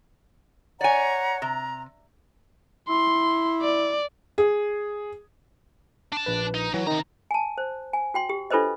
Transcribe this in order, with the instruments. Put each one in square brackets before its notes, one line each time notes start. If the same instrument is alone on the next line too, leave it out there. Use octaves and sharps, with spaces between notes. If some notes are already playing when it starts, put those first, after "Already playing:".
[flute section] C#5 F#5 A#5 [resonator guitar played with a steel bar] D5 G#5
[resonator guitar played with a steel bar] C3 [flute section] A#5
[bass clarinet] E4 [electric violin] C6
[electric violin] D5
[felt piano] G#4
[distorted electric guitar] D4 A5
[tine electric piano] A#1 B4
[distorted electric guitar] D#4
[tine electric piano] E3 [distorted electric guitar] F#3
[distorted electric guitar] C3 A#5 [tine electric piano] D#3 D#4
[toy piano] G#5 A5
C5
G#5
F#4 G5 C6
G4
D4 F4 A4 B4 C5 D#5